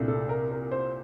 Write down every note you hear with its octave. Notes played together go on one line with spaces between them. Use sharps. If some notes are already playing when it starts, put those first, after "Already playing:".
Already playing: C2 A#2 A3 D4
A4
A#4
A#4
C5